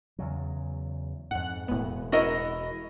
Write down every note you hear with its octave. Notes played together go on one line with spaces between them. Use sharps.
E2 C#3 F#3
F2 G#2 F#5 F#6
E1 A2 G#3 B3
E4 F#4 A#4 D#5